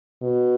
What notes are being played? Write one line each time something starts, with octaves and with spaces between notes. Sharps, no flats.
B2